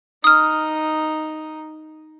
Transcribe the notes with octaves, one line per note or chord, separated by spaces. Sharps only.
D#4 D#6 F6